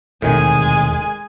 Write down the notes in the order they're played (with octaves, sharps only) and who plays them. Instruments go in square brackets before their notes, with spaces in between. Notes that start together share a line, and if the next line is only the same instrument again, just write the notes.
[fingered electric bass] E1 D#2 C3 [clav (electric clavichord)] A2 D#3 [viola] G#3 G#5